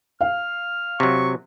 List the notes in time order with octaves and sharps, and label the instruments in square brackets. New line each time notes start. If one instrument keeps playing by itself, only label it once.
[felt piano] F5 [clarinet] F6
[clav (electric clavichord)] C3 F#3 [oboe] C#6